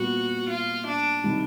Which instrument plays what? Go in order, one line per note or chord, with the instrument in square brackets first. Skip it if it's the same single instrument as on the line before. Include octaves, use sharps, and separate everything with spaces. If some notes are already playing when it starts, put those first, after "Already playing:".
Already playing: [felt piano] A#2 G3 B3 [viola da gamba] F#4
[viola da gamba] F4
D4
[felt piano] C3 D#3 G3